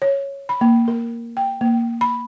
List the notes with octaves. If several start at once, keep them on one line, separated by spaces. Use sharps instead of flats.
C#5
B5
A#3
A#4
G5
A#3
B5